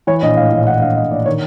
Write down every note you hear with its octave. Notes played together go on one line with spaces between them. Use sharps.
E3 C#5
A#1 D#5
A2 F5
A#1
E3 F#5
A#1 F5
A2 D#5
A#1 D5
D#3 C#5